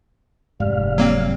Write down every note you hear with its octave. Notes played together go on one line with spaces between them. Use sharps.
F1 G#2 G3 F5
F#3 A#3 C4